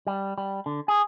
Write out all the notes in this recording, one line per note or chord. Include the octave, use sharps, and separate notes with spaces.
G3
G3
D3
G#4